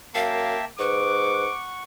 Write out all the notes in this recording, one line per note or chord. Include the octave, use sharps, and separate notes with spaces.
F#2 A#3 E5 F5 G5 A5
G#2 B4 F#5 C#6 D6